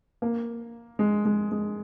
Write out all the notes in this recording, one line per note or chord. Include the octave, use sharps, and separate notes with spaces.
A#3
G#3
G#3
G#3